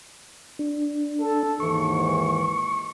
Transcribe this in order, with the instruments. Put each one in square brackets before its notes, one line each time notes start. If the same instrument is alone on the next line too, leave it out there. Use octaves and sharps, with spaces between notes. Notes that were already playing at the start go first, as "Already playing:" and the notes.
[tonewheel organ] D4
[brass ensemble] A4
[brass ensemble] D#2 G#2 E3 [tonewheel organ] C#6